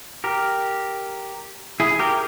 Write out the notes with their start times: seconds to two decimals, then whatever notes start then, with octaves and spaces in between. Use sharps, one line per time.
0.24 G4 A#4
1.80 E4 G#4
1.99 G4 A#4